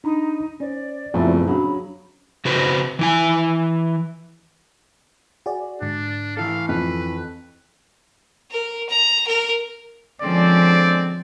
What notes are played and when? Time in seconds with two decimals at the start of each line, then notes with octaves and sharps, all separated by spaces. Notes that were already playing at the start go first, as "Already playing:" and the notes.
0.04 D4 D#4 A#5 B5
0.60 C#4 C5 D5
1.14 F#1 F2 A#2 F3 A3 B3 E4
1.47 C#3 F#3 D4 B5
2.45 C#3 F#4 B4 C5
2.99 E3 E4 G#5
5.46 F#4 G#4 D5
5.82 G#2 D3 D4
6.37 E3 E4 A4 F5
6.69 F2 B4
8.51 A#4
8.89 A#5
9.27 A#4
10.22 D3 F3 G#3 C4 C#4 D5